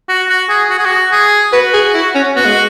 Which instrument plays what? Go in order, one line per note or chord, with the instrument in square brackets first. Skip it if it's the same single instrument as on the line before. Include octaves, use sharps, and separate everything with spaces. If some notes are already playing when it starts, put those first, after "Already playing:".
[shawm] F#4
F#4
G#4
F#4
G#4
F#4
G#4
[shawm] F#4 [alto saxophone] B4
[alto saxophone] G#4
E4
C#4
[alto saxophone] B3 [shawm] F#4
[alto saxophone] G#3